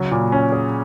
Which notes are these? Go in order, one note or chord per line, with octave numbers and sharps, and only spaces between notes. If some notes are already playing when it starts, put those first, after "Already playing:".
Already playing: C#3 F#3
A#2
C#4
G#4